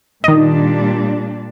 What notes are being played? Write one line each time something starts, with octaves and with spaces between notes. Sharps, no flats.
A#2 D#3 G3 D4 D#5